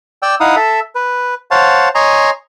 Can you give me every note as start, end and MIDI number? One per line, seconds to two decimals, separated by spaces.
0.22 0.35 74
0.22 0.35 79
0.22 0.35 88
0.40 0.56 63
0.40 0.56 64
0.40 0.56 77
0.40 0.56 78
0.40 0.56 87
0.56 0.80 69
0.56 0.80 76
0.95 1.34 71
1.51 1.89 72
1.51 1.89 73
1.51 1.89 77
1.51 1.89 78
1.51 1.89 81
1.95 2.30 73
1.95 2.30 75
1.95 2.30 80
1.95 2.30 82
1.95 2.30 84